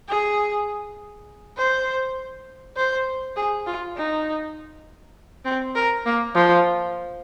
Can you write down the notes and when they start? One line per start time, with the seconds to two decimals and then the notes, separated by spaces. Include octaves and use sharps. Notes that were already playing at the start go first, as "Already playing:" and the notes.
0.08 G#4
1.57 C5
2.76 C5
3.36 G#4
3.67 F4
3.97 D#4
5.45 C4
5.75 A#4
6.06 A#3
6.35 F3